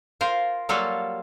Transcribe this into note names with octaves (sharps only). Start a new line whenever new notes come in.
F4 A#4 C5
F#3 G3 A#3 F4 A4